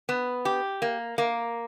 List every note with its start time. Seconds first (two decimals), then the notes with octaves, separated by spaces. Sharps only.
0.09 B3
0.45 G4
0.82 A#3
1.18 A#3